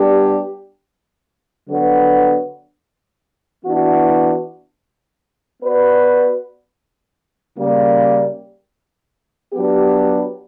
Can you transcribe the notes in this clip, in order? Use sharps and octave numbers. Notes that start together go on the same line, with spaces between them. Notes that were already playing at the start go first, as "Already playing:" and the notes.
Already playing: G3 B3 D4 G4
D3 F#3 B3 F#4 B4
E3 B3 D4 F#4
B3 F#4 B4 D5
C#3 G3 A#3
F#3 B3 D4 G4